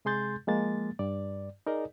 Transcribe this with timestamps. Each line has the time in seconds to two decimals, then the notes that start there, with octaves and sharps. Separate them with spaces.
0.05 C3 G#3 G#4 C6 G6 A6
0.47 F3 G#3 A#3 A6
0.99 G2 D5
1.67 D#4 G#4 A#4 D5 D#5